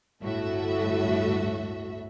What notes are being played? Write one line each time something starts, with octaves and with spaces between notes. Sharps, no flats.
G1 D2 A2 F#4 A4 E5